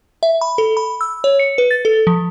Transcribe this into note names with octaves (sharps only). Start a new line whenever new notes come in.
E5
B5
A4
B5
E6
C#5
C#7
B4
A6
A4
F3